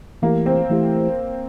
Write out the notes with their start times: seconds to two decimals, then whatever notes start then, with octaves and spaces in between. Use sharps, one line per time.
0.22 E3 A3 A#3 E4 G4
0.46 C4
0.70 E3 A3 E4 G4